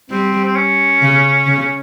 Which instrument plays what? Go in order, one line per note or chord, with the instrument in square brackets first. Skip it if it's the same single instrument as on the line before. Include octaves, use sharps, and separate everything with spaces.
[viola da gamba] G3 [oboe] C4
[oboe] C4
C#4
[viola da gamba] C#3
C#3